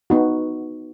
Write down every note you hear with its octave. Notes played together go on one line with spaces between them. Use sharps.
B3 D#4 F#4